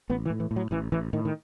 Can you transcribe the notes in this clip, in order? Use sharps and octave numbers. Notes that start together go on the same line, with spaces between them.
A1 B3
E3
A2
E3
A2
F#3
A1 E3
A1 E3
A2 D#3
D#3